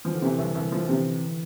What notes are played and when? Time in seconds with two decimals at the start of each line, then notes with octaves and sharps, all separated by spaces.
0.05 E3 F3
0.15 D3
0.22 C3 E3
0.39 C2
0.55 C2
0.72 F3
0.89 C3